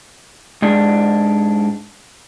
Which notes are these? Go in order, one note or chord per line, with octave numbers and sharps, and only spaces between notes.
G#2 D4